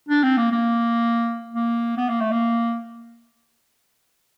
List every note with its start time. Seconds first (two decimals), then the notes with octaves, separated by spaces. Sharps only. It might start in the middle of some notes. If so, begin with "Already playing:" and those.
0.09 D4
0.23 C4
0.37 A#3
0.52 A#3
1.54 A#3
1.97 B3
2.09 A#3
2.20 A3
2.31 A#3